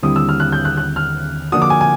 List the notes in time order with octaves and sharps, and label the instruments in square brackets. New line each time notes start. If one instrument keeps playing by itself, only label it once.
[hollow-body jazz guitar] D#2 D3 G3 C4 E4 [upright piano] D#6
[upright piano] E6
F6
F#6
G6
F#6
F#6
F6
[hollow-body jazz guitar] D3 F3 A#3 D4 F#4 [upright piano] D#6
[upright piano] D6
G#5
G#5